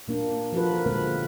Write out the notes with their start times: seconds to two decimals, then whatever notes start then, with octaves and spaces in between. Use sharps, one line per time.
0.08 A#2 A#3 D4
0.53 F3 F4 F#4 A4 B4
0.70 E3 A#4
0.86 A#2 D3 G#3 A#3 C4 B4